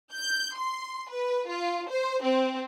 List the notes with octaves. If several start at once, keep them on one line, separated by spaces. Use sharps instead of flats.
G6
C6
B4
F4
C5
C4